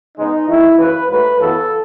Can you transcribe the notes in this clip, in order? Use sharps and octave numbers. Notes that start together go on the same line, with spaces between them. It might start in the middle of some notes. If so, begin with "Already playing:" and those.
C#3 G#3 B3 D#4
E2 D#3 A3 E4
F#2 C#3 E3 B4
G#2 F#3 A3 B4
F#2 C#3 E3 B3 A4